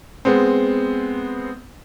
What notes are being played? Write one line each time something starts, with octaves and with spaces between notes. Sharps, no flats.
G#3 B3 C4